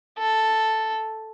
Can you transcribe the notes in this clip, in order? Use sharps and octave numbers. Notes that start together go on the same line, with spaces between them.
A4